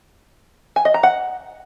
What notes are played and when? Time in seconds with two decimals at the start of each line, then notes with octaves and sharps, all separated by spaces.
0.76 G#5
0.85 D#5
0.94 A#5
1.03 F#5